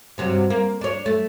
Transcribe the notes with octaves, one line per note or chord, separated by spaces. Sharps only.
G2 C3 F#3
A#3
D4 C#5
A3